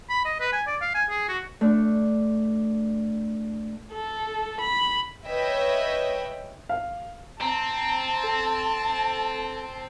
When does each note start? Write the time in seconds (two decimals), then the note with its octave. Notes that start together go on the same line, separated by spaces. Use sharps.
0.09 B5
0.25 D#5
0.40 B4
0.53 G#5
0.67 D5
0.81 F5
0.95 G#5
1.10 G#4
1.28 F#4
1.61 A3 D4
3.94 A4
4.61 B5
5.27 B4 C#5 D#5 E5 G5
6.69 F5
7.41 C4 A5 A#5
8.24 A4